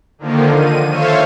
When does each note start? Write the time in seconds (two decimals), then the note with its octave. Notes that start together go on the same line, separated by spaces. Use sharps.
0.18 D3 D#3 F3 A#3
0.53 D#7
0.90 A4 C5 C#5 E5 F5